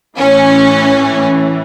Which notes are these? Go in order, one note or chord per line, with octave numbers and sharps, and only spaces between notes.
A2 E3 C#4